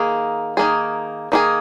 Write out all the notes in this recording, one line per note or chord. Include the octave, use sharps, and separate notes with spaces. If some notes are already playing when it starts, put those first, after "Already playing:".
Already playing: D#3 A#3 G#4
D#3 A#3 G#4
D#3 A#3 G#4